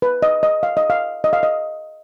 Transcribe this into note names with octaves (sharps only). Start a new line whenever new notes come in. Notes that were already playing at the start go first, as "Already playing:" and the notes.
B4
D#5
D#5
F5
D#5
F5
D#5
F5
D#5